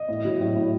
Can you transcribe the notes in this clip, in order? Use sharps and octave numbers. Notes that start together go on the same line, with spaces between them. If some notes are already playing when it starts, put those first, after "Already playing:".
Already playing: D#5
A2
F#3
A2
A2